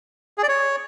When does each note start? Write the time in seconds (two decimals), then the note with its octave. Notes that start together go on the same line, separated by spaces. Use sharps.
0.38 G#4
0.43 D5
0.48 C#5